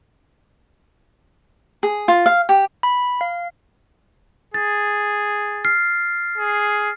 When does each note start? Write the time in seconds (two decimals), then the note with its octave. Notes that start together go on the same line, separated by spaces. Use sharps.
1.83 G#4
2.08 F4
2.26 F5
2.49 G4
2.83 B5
3.21 F5
4.54 G#4 A6
5.65 F6 C7
6.38 G#4